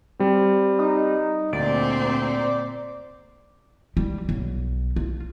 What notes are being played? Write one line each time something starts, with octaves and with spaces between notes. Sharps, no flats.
G3 C4
D#4
D2 A#2 C4 D5
G3
B1
F4